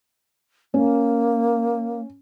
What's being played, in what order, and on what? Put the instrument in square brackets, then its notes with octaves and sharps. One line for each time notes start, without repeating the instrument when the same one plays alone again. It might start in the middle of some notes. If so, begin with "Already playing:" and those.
[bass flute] A#3 [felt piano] C#4